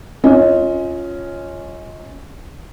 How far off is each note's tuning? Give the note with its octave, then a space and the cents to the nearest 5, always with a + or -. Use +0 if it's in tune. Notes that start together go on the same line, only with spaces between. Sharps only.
C#4 +0 F4 +0 D#5 +25